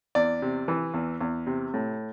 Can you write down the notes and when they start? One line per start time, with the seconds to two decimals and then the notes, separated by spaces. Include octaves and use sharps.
0.15 E2 D5
0.42 C3
0.68 E3
0.94 E2
1.21 E2
1.47 C3
1.74 A2